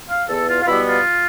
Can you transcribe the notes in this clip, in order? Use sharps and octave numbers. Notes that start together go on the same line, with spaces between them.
F5
E2 A4
F4
F4
B2 G3 B3 E4
F4